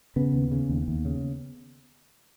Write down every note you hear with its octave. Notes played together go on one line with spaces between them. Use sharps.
C#3 B3
D#2
C#3
D#2
D#2
C#3